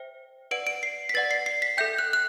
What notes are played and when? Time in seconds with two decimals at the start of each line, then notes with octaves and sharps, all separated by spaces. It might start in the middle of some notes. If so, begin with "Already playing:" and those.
Already playing: C5 E5 G5
0.51 B4 D5 F#5 D7
0.67 D7
0.83 C7
1.09 B6
1.14 B4 D5 F#5 A6
1.31 C7
1.46 C7
1.62 B6
1.77 A4 E5 G5 G6
1.98 F#6
2.13 F#6